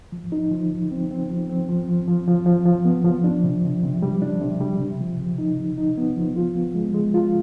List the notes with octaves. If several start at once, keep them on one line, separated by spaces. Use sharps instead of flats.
F3
D#4
F3
F3
C4
C4
F3
C4
F3
F3
F3
F3
F3
F3
B3
F3
D4
C3
C3
C3
G3
D4
C3
G3
C3
F3
C3
D#4
C3
D#4
B3
F3
F4
B3
G#3
G#3
F4